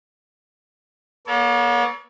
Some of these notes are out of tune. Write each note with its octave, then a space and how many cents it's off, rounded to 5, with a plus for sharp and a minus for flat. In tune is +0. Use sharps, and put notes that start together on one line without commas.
A#3 +45 A4 +0 C#5 +35